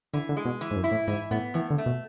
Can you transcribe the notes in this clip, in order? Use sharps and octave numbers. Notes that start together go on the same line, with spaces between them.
D3 E3
D3
G#3
B2
E3
G#2
F#2
E4
A2
G#2 E3
A2 B3
A2 E3
D3
A3
B2